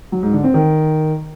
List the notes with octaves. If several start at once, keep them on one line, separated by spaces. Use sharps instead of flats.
F#3
G#2
D3
C4
D#3